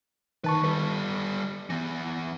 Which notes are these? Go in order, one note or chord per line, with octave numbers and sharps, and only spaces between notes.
D#2 D#3 B4 A5 C#6
G3 A4 B4
E3 B3